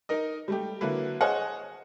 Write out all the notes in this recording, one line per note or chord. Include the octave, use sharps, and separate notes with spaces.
D#4 A#4 D#5
G3 A3 G4
D3 F#3 A#3 E4 B4
G#4 C5 C#5 D#5 F#5 G#5